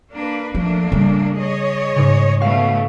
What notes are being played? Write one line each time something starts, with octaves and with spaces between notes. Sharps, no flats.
A#3 D4 B4
F3 A3 A#3 D4
C#3 G3
G#4 C#5 D#5
G#2 C#3
B2 A3 C#4 F5 F#5 C#6